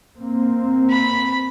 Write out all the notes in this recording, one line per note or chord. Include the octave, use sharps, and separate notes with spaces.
A#3 C4
B5